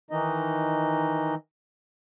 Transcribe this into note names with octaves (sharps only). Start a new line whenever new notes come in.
D#3 E3 D#4 D#5